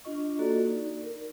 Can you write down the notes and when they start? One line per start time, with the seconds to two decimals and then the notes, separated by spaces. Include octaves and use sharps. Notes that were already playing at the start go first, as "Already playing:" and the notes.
0.05 D4 F4 D#5 C#6
0.39 A#3 F#4 A4 D5
0.66 D#4 D5
1.04 A#4